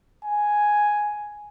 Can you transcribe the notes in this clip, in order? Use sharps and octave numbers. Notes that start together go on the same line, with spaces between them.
G#5